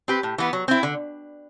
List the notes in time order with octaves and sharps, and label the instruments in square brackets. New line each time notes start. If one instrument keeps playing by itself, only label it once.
[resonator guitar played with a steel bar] C4 G4 B4
A2
E3 B3
F#3
C4 E4
D3